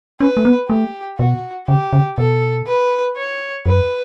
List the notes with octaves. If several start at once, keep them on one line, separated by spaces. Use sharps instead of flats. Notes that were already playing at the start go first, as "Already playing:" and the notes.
C#4 B4
A3
B3
A3 G4
B2 F#4
C#3 G4
C#3
B2 A4
B4
C#5
F#2 B4